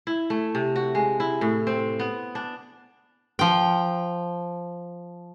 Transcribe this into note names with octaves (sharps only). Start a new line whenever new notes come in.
E4
A3
C3
F#4
G#3
E4
A2
C4
B3
D4
F3 G5